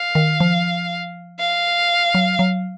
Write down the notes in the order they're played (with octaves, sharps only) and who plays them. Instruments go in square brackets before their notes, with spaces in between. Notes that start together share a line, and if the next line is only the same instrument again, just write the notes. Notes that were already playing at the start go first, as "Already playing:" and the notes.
Already playing: [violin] F5
[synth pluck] D#3
F3
[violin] F5
[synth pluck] F#3
F#3